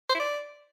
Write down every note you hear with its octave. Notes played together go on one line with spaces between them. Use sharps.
C5
E4
D5